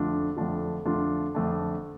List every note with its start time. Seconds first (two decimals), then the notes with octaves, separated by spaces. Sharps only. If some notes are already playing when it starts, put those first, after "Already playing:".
Already playing: F2 D3 A3 D4 F4
0.37 F2 D3 A3 D4 F4
0.85 F2 D3 A3 D4 F4
1.35 F2 D3 A3 D4